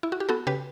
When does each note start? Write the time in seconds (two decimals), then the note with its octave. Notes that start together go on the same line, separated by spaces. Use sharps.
0.03 E4
0.12 F#4
0.20 G4
0.29 B3 F#4 A4
0.47 C#3 G4 B4